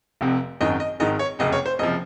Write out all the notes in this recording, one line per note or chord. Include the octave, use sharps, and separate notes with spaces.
F1 F2 C3
G#1 F#2 D#3 D#5
D#5
G#1 G#2 D#3 D#5
C#5
F#1 F2 C3 D#5
C#5
C5
F#1 C3 F3 D#5